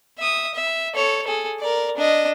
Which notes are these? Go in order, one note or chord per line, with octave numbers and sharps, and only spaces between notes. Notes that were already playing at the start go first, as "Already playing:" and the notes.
E5 D#6
E5
A4 C#5
G#4 A4
A#4 D5
D4 D#5